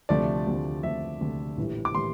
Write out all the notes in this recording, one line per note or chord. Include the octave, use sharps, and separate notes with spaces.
D2 C3 F3 A3 D5
D2 C3 F3 A3
D2 C3 F3 A3 E5
D2 C3 F3 A3
A#1 A2 E3 G3
D6
A2 E3 G3 C6